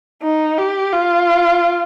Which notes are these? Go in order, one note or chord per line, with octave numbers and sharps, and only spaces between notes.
D#4
G4
F4